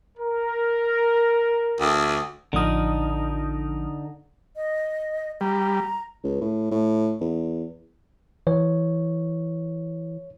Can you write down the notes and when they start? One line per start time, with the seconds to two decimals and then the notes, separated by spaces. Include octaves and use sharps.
0.18 A#4
1.81 D2
2.53 A1 D3 F3 D#4 D#6
4.55 D#5
5.41 G3 A#5
6.24 C#2
6.41 A2
6.71 A2
7.21 E2
8.47 E3 C#5